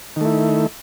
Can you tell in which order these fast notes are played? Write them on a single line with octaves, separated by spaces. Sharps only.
D#3 A3 E4